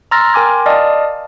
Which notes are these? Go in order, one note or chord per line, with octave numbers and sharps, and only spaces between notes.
A#5 C6 E6 F6 A6 A#6
A#4 G5 G#5 C6 D6 G#6
D5 D#5 F5 A5 D#6 F6